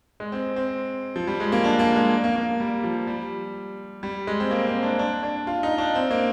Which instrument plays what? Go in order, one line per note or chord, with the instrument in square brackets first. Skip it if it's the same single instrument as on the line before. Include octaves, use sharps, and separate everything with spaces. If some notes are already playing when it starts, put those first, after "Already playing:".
[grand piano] G#3
C4
C4
F3
G3
G#3
A#3
D4
A#3
G#3
A#3
A#3
G3
F3
G3
G3
G#3
C4
A#3
C4
D4
D4
D4
F4
D#4
D4
C4
A#3